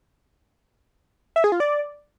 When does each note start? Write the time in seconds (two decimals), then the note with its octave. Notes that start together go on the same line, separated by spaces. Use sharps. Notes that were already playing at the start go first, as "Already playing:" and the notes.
1.36 E5
1.44 G#4
1.52 F4
1.60 D5